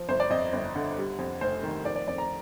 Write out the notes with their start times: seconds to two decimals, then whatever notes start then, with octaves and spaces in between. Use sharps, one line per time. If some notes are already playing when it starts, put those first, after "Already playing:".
Already playing: F3
0.08 G1 C5
0.20 D5
0.30 F2 D#5
0.53 G1
0.75 D3
0.98 G3
1.19 F2
1.41 F1 C5
1.63 D#3
1.85 F3 D5
1.96 D5
2.08 F2 D5
2.18 A#5